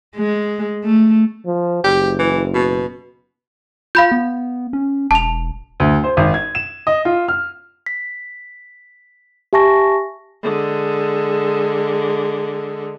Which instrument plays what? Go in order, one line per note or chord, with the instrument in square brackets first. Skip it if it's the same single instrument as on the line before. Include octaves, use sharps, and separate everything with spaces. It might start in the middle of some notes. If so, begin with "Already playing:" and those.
[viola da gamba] G#3
A3
[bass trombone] F3
[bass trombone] F#1 [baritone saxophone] G4
[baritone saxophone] E3
B2
[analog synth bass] F4 [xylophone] F5 B5 G6
[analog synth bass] B3
C#4
[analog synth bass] E1 [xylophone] A5 F7
[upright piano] D2
C5
G#1
G#6
E7
D#5
F4
F6
[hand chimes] B6
G4 E5 G#5 A5 C#6 A#6
[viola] D3 G#3